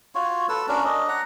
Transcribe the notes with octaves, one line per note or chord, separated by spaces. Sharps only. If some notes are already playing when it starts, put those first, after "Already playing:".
F4 F#4 C#5
A4 B4 E6
C#4 D4 F#4 A#4
D4 D#5
F#5 A#5